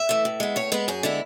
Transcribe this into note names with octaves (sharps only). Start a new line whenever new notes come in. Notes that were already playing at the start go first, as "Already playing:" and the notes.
Already playing: E5
E3 A3
A2
G#3 B3
A2 C#5
G#3 B3 B4
F#2 G#4
D3 G#3 B3 E4